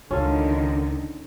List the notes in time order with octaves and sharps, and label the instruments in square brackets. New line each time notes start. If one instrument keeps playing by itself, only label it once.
[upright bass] C#2 [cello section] D3 D#3 [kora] C#4 F4 A4